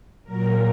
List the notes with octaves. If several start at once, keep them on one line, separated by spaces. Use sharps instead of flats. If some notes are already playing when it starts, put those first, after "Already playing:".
A#2 F#3 A#4